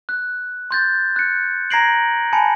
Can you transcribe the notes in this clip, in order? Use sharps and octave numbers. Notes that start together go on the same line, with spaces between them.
F#6
C6 G6 A6
F#6 C#7
A#5 G#6 A#6 C7 D7 F#7
G#5 A5 B5 C#7